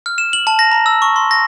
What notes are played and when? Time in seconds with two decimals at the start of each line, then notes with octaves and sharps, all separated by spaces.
0.06 F6
0.18 E7
0.33 F#7
0.47 A5
0.59 A#6
0.71 A#5
0.86 E6
1.02 C#6
1.16 C6
1.31 A#6